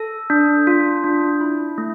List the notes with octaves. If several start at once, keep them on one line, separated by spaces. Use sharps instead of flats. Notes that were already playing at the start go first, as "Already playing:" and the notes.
Already playing: A4
D4
F4
D4
E4
A3